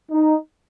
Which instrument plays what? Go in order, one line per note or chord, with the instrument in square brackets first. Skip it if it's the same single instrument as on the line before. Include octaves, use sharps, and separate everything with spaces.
[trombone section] D#4